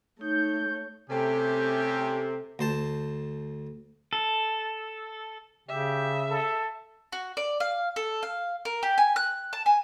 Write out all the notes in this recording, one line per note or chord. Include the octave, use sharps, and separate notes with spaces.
A3 D#4 C#5 G6
C3 A3 C#4 G4 A4
D2 C5 A5
A4
C#3 G4 E5
A4
F#4
D5
F5
A4
F5
A#4
G4
G#5
F#6
A5
G#5